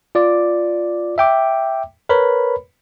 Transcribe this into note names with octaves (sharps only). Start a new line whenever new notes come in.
F4 D5 D6
E5 G5 D6
A#4 B4 C#5 B5